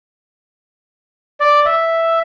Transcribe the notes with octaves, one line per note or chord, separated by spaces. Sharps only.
D5
E5